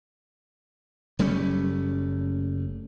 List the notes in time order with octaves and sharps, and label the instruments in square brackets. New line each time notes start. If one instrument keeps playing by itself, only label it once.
[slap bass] F#1 G3 A3 C#4